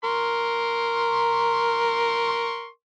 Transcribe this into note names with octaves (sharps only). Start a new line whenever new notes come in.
A#4 C6 C#6